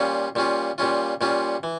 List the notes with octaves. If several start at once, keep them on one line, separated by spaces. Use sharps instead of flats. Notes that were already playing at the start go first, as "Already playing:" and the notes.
Already playing: A#2 G3 C#4 F4
A#2 G3 C#4 F4
A#2 G3 C#4 F4
A#2 G3 C#4 F4
E3